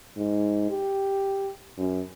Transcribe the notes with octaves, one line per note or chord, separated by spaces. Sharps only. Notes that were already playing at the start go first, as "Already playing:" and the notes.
G#2
G4
F#2